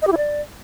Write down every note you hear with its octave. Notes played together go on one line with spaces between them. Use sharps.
D#5
G4
E4
D5